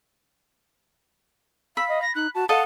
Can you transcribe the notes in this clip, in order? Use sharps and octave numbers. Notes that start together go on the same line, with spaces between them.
F5 B5 E6
D#5
A#6
D#4 F#6
F#4 A5
A4 D#5 F5 F#5 A5